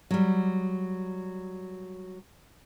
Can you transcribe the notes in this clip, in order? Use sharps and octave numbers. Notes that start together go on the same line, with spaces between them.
F#3 G3